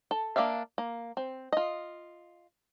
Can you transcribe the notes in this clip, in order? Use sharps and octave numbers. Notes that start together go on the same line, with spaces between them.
A4
A#3 D4 D5 E5 F5
A#3
C4
F4 D#5